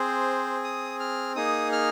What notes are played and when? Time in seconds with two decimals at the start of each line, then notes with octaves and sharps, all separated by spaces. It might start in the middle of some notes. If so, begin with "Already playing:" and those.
Already playing: C4 G#4 C5
0.64 D#6
1.00 F6
1.36 A#3 D#4 G#4 D#6
1.72 F6